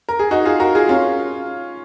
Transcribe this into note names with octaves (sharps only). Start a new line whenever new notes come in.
A#4
G#4
D#4 F#4
F4 G#4
F#4 A#4
F4 G#4
C#4 F4